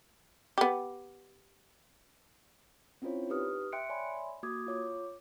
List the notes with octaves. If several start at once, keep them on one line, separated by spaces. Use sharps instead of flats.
B3 G4
C4 C#4 E4 F4 C5 C#5
D#4 G4 B4 D#6 F6
E5 G5 C6 F#6 C#7 D7
C#5 D5 E5 G#5 B5 C6
A#3 F#4 D6 D#6 G#6
F4 C#5 D6